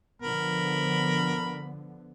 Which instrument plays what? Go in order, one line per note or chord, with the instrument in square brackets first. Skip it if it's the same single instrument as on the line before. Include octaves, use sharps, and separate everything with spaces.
[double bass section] D3 F3 B3 [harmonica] A#4 B5